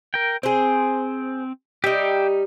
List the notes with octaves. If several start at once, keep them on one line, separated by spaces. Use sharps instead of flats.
A#4 G5
C4 G#4 C5
G3 D#4 G4 E5 G5